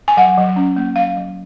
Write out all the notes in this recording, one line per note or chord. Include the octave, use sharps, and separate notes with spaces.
G#5
F#3 F#5
F#3
C#4
A#3
F#3 F5
F#3